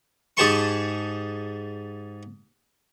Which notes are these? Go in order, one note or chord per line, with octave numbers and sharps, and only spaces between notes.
G#2 G4 G#4 A5 C6 C#6